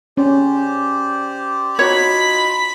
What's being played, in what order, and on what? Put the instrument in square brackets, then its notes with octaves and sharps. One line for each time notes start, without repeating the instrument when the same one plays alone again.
[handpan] C#4 [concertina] G4 C5 D5
[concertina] D#4 F4 [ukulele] F#4 C#5 [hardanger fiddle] B5